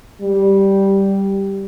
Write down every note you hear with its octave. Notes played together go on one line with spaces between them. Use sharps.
G3